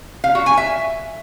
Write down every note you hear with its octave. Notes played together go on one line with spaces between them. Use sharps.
F5
F#4
G#5
E5